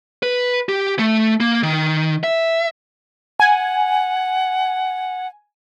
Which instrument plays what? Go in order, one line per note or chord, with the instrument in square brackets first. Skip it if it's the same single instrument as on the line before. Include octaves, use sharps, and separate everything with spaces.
[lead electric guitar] B4
G4
A3
A#3
D#3
E5
[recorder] F#5 [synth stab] G#5